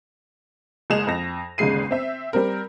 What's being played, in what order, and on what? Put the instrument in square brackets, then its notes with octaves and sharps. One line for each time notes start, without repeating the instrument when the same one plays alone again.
[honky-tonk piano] F#1 G#3 G#4 D#5 E7 F7
F2 A#6
G1 D#2 C#3 G#3 C7 D#7
C4 E5
G3 C4 A#4